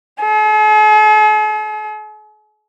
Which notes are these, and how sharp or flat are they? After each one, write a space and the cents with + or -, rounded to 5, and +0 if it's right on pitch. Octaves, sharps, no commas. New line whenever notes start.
G#4 +45